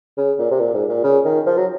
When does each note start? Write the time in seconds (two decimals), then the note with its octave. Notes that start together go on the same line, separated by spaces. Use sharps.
0.17 C#3
0.39 A#2
0.51 C3
0.60 A#2
0.74 G#2
0.89 A#2
1.04 C#3
1.25 D#3
1.46 F3
1.57 F#3